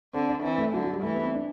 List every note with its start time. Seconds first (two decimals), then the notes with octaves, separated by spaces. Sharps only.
0.14 D3 C4
0.29 D4
0.43 E3 C4
0.58 A3
0.73 D3 F#3
0.84 F#3
0.93 G3
1.03 E3 A3
1.15 B3
1.23 C4
1.34 D4